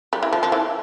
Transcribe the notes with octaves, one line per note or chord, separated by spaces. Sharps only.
G3
E3
F3
F3
E3